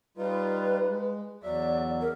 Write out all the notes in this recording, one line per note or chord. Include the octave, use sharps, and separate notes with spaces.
G3 D#4 F4 B4
G#3
E2 F#3 D5 E5
A#4